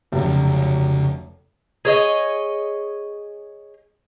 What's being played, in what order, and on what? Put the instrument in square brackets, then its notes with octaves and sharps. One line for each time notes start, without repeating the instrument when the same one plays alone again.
[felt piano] F1 F#2 [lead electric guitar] C#2
[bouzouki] G#4 C#5 D#5